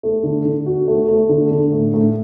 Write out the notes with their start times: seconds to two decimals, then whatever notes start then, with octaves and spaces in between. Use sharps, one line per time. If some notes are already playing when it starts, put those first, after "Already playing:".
0.03 A3
0.24 D3
0.45 D3
0.66 F#4
0.88 A3
1.09 A3
1.29 D3
1.51 D3
1.72 A2
1.94 A2